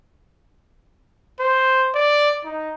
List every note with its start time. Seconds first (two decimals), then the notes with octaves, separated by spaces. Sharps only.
1.40 C5
1.95 D5
2.45 D#4